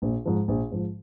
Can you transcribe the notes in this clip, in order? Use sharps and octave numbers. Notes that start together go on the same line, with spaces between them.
A#1
G#2 F3
A#1
G#2 F3